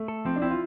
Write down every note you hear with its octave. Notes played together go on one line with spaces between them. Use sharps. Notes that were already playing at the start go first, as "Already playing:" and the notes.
Already playing: A3
A4
F3 C4
D4
C4 E4
F4